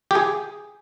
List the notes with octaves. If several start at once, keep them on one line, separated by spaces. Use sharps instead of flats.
G4
G#4